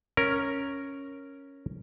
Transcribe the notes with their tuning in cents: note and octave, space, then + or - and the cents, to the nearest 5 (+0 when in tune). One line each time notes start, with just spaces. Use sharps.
C#4 +0 A#4 +0